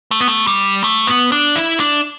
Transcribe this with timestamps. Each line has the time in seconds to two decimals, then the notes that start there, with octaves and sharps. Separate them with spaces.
0.11 A3
0.20 B3
0.28 A3
0.47 G3
0.84 A3
1.07 B3
1.32 D4
1.56 E4
1.80 D4